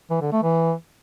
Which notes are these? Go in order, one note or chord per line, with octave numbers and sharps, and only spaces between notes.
E3
D3
A3
E3